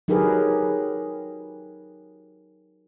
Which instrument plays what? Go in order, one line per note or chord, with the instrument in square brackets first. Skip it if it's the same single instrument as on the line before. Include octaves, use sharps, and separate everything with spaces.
[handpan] F#3 D#4 G4 G#4 A#4 B4